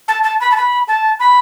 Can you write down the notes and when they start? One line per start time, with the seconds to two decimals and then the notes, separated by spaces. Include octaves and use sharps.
0.08 A5
0.24 A5
0.41 B5
0.52 A5
0.57 B5
0.88 A5
1.20 B5